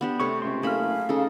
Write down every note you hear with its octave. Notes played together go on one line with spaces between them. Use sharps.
B3 D4 G4
C3 A3 C#5 C#6
C#2 C4 C6
F#1 A3 G#4 F5 B5 F6
C#3 D#4 A4